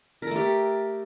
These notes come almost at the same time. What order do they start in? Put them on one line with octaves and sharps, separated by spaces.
A#4 A4 A3 G4